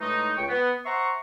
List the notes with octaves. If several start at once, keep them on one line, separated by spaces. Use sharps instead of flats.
A2 E3 G#3 A3 D#4
C#2 G5 C#6
B3
C5 E5 F#5 A#5 C6 C#6